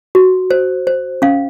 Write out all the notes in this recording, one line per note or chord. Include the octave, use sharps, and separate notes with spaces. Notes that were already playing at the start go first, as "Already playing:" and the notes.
F#4
C5
C5
C#4 F5